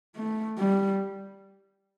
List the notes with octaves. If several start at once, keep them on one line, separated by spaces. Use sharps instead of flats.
A3
G3